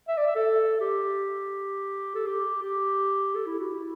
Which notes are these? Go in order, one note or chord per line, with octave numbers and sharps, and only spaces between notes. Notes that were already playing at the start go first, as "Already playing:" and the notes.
E5
D5
E5
A4
G4
A4
G4
G4
A4
E4
F#4
E4